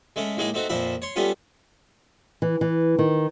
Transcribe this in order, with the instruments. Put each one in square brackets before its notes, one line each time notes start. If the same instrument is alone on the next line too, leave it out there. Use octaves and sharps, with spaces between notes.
[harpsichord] G#3 A3 C#4
A2 G#3 A#3 D#4 G#4
A3 C4 D#4 F#4
F2 A#2 F3 E5 B5
C#5 C6
G3 A3 B3 C#4 F4
[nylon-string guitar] E3
E3
D#3